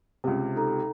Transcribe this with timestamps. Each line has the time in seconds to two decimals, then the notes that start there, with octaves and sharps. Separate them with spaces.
0.24 C#2 C3
0.55 D#4 A4 A#5